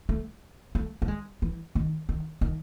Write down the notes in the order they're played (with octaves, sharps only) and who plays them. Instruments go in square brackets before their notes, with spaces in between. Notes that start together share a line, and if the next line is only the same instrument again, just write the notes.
[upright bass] A3
A3
A3
G#3
E3
D#3
D#3
D#3